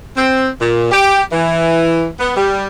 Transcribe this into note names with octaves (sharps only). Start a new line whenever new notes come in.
C4
A#2
G4
E3
B3
G3